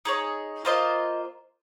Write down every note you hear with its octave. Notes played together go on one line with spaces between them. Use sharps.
D#4 G#4 C#5
A#3 F4 C5 D#5